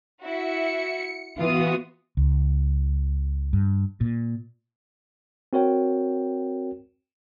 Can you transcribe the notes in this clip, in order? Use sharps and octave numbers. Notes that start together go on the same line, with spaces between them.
E4 F#4 E5 C#7
E3 B3 F4 F#4 D#6
C#2
G2
A#2
C4 F#4 A#4 C#5 G5